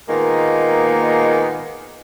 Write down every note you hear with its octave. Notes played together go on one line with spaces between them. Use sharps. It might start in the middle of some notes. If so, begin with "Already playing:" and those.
A#2 D#3 G#3 A#3 B3